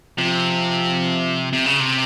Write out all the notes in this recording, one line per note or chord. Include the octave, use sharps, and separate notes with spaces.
C3 F3
C3
C#3
C3